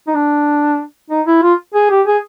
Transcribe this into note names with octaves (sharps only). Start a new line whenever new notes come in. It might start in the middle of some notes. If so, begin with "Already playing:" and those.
D#4
D4
D#4
E4
F4
G#4
G4
G#4